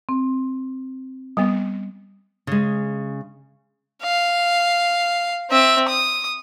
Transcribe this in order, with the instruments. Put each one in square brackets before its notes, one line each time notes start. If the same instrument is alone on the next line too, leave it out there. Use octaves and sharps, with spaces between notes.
[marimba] C4
[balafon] G3 B3
[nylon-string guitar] C#3 G#3
[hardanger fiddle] F5
C4 E5
D#6